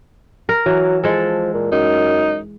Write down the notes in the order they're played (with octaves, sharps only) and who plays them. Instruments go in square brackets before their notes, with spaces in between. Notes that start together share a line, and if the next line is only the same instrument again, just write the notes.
[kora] A#4
[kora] E3 [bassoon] F#3
[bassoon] F3 [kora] G#3 A4
[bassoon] A#2
[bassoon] F#2 [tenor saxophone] D#4